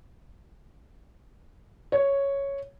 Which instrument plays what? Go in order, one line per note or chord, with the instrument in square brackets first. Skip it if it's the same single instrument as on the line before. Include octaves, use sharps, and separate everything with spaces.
[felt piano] C#5